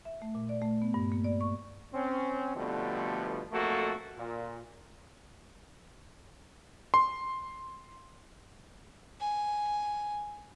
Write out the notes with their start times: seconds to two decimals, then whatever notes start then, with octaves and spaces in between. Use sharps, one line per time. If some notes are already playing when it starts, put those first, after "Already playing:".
0.05 E5
0.22 A3
0.35 A#2
0.49 D5
0.62 A3
0.82 B3
0.94 G2
1.12 A#3
1.24 D5
1.41 C#6
1.94 C4 C#4
2.56 B2 D3 F3 G3 A3 B3
3.52 B1 F2 A3 A#3 F#4 A4
4.17 A#2
6.94 C6
9.20 G#5